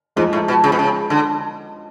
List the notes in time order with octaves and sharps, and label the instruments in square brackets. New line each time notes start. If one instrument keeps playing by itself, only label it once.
[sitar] G#2 [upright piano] F3 G#3
[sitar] A2
B2
C#3
B2
C#3
D3